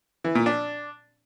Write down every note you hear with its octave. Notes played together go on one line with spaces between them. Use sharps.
E3
A#2
D4